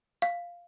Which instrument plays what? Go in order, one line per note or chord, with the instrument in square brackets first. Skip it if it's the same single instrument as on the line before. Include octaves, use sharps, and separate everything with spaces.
[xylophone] F5